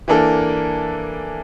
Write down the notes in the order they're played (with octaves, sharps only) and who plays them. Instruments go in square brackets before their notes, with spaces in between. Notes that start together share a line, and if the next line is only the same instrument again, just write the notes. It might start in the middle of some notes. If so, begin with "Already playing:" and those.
[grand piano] E3 A#3 D4 A4